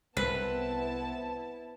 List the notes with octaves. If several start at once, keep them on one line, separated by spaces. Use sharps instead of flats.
C2 B3 C4 E4 B4 A5